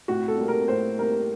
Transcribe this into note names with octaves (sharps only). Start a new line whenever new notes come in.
A2 F#4
A4
G3 A#3
A#4
A2 C5
G3 A#3 A#4